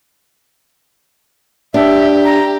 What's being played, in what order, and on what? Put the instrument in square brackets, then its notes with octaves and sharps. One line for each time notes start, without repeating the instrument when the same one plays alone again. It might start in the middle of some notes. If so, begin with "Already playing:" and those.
[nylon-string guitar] D4 [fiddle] G4 [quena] E5
[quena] A#5